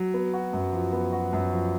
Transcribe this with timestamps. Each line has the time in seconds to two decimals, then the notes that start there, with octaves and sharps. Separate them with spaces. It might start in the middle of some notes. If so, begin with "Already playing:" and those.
Already playing: F#3
0.14 B3
0.33 F#4
0.53 F#2
0.73 F3
0.92 B3
1.13 F#4
1.33 F#2
1.52 F3